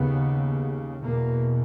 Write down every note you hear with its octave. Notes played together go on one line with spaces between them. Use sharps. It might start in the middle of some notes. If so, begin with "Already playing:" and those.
Already playing: D#2 C#3 B3
E2 B2 A#3